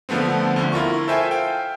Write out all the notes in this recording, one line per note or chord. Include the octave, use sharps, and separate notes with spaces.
D3 F3 A3 B3 C4
D2 D3
E4 F4 A#4 C#6
A4 C5 E5 G5 G#5
F5 G5